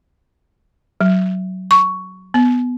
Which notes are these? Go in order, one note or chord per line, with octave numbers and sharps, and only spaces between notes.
F#3
C#6
B3